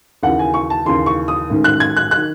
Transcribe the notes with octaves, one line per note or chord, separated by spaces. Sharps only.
D#2 C#3 E3 F#5
G#5
C#6
A5
D#2 C#3 E3 C6
C#6
D#6
A1 G#2 D#3
F#6
G#6
F#6
F#6
D#3